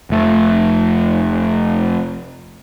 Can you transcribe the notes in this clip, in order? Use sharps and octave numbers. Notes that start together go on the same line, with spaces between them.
F1 A3